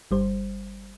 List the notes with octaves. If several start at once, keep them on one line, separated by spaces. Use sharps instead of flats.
G1 G3 C5